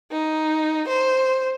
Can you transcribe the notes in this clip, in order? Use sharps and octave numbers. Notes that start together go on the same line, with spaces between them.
D#4
C5